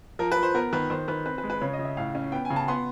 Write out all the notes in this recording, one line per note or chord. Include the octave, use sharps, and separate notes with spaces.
F3 A#4
B4
F3
C5
B3 A#4
D#3 B4
D#3 C5
D#3 B4
C4 B4
B4
G#3
B4
C#3 C#5
D#5
C#3
E5
A2 F5
C#4
B3 G5
G#5
C#3
A5
B3 C6